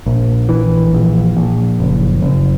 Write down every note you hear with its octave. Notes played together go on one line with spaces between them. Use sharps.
A#1
E3
A#1
A#1
F#1
F#1